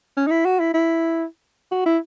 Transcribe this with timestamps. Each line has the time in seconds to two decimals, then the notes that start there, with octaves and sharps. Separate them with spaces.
0.17 C#4
0.27 D#4
0.31 E4
0.45 F#4
0.60 E4
0.74 E4
1.71 F#4
1.86 E4